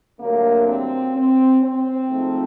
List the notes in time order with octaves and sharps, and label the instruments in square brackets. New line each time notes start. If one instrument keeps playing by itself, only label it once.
[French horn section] G2 D3 F#3 A3 A#3
C4
C4
C4
G#2 F3 A3